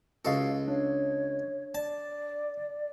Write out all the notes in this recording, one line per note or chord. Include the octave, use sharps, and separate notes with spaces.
C#2 F#4 A4 D#5 F5
D4 C#5
D5 A5